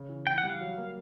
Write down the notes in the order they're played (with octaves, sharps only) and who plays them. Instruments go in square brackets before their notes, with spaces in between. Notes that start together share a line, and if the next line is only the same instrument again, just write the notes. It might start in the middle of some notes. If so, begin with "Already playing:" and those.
Already playing: [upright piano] C#3
E3
[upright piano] E3 [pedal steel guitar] G5
[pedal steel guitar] F#5
[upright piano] G3
[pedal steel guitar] F5
[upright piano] F#3
A#3